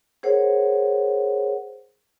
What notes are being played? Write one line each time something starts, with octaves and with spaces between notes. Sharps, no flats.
G#4 A#4 C5 C#5 F#5